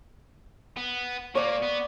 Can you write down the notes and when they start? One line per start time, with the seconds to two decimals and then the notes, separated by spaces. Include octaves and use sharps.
0.77 B3
1.35 A#2 A#3 C#5 D5
1.63 B3